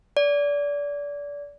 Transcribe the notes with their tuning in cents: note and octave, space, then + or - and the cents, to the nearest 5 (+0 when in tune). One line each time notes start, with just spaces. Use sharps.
D5 -25